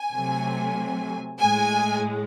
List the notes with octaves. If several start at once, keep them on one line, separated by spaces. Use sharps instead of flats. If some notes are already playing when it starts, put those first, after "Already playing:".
Already playing: G#5
C3 F#3 A3
A2 G#3 G#5